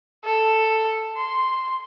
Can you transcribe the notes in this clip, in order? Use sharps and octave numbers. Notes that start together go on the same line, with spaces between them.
A4
C6